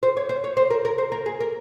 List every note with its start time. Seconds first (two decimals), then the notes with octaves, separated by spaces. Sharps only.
0.03 C5
0.17 C#5
0.29 C5
0.44 C#5
0.57 C5
0.71 A#4
0.85 A#4
0.98 C5
1.12 A#4
1.26 G#4
1.40 A#4